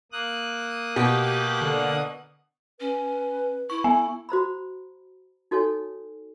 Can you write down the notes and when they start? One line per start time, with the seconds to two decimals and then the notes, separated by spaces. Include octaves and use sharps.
0.12 A#3 D#6 F#6
0.96 B2 G4
1.61 D3
2.80 C#4 B4
3.70 E4 C#6
3.84 B3 G#5
4.29 F#4 C5 A#5 B5
5.51 D#4 F#4 A4 C#5 G#5